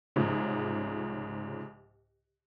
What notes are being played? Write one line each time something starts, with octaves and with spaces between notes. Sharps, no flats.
C2 G#2 C#3 F3